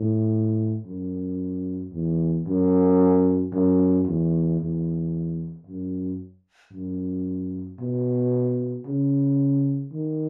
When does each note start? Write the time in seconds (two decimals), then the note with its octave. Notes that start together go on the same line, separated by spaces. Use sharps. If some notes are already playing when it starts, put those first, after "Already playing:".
Already playing: A2
0.86 F#2
1.93 E2
2.46 F#2
3.53 F#2
4.07 E2
4.60 E2
5.66 F#2
6.73 F#2
7.80 B2
8.86 C#3
9.93 D#3